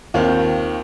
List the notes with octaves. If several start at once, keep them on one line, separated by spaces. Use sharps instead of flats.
D#2 D#3 C4 F4